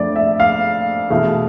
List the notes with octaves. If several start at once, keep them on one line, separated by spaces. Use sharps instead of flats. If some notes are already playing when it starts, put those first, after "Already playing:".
Already playing: F2 D3 A3 D5
E5
F5
E2 B2 A3 E4 F5